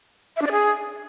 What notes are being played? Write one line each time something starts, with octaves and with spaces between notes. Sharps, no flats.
E5
D4
D5
G#4